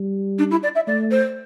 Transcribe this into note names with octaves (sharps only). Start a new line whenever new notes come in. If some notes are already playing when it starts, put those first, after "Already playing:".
Already playing: G3
D4
E4
D5
E5
A3 D5
C5